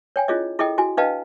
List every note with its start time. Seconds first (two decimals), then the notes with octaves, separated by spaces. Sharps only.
0.16 C#5 G5 G#5
0.28 C#4 E4 F4 G#4 C#5 D#5
0.59 E4 G#4 A4 D#5 G5
0.78 E4 F#4 G#5
0.97 D4 B4 D#5 F5 G5 A5